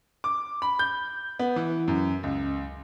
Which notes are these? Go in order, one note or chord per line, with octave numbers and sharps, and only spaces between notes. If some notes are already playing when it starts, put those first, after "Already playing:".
D6
B5
G6
B3
E3
F#2
C#2